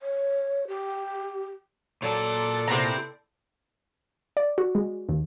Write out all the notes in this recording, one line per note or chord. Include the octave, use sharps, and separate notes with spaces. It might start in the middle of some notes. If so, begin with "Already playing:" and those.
C#5
G4
A#2 F#3 A4 D5
C3 B3 C4 E4 A#5
D5
F#4
G#3
D#2